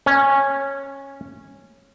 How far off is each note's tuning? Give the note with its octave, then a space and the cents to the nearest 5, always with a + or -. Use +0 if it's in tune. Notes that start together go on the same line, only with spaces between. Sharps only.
C#4 -10